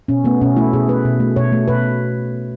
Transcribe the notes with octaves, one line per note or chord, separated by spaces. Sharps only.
B2 C#4
A3 B3
B2 C#4
A3 E4
B2 G#4
A3 B4
B2
A3
B2 C#5
A3
B2 B4